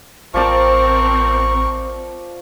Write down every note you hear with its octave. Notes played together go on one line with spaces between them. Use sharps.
A1 F3 C4 A#4 D5 A5 C#6